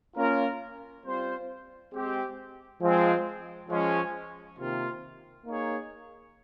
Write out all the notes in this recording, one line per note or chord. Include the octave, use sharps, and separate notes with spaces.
A#3 C#4 F4 A#4
G3 C4 F4 C5
G#3 C4 G4
F3 G#3 C4
F3 G#3 C#4
C3 D#3 A#3 F4
A#3 D#4 G#4 C#5